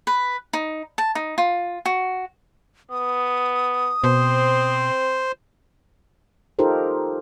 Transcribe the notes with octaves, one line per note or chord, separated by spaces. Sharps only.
B4
D#4
A5
D#4
F4
F#4
B3 D#6
B2 C4 C5
D#4 F4 G4 A4 A#4 C5